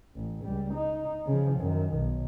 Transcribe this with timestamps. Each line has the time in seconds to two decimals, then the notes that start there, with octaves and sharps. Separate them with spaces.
0.15 A1
0.45 C#2 G3
0.74 D#4
1.26 C#3 F3
1.59 F#2 D#3
1.94 B1